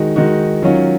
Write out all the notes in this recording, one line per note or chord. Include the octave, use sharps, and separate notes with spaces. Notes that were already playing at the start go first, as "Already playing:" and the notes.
Already playing: D#3 G#3 D#4 F#4
D#3 G#3 D#4 F#4
D#3 F#3 C#4 F4